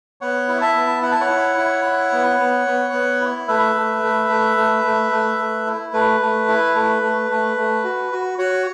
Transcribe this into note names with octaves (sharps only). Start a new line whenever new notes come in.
B3 C#5 F#5
E4
E5 A5
B3
E4 F#5
A5
C#5 F#5
E4
E4
E4
B3
B3
B3
B3
E4
A3 B4 E5
A3
A3
A3
A3
A3
A3
A3
E4
A3 B4
A3
E4
A3
A3
A3
A3
F#4
F#4
F#4 C#5 F#5